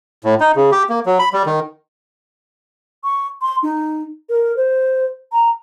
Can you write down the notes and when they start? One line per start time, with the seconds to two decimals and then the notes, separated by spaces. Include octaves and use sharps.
0.24 A2
0.40 D#4
0.56 C#3
0.72 G4
0.89 A#3
1.06 F#3
1.19 B5
1.33 G3
1.46 D#3
3.04 C#6
3.42 C6
3.63 D#4
4.30 A#4
4.57 C5
5.32 A#5